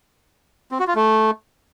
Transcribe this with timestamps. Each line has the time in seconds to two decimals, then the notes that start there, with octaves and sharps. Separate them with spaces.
0.72 C4
0.79 F#4
0.87 F4
0.95 A3